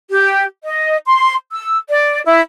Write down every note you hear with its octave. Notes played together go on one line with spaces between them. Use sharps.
G4
D#5
C6
E6
D5
E4